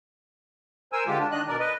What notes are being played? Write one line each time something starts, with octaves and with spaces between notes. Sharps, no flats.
A#4 C5 G#5 E6
D3 G#3 F4 G4
D4
D#3 D4 D#5 F#6
B2 A#4 D5
B4 D#5